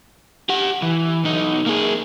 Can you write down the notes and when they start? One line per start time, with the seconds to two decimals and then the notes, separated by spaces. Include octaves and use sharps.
0.49 G4 F#5
0.82 E3
1.24 B1 D#4
1.66 A#3 G#4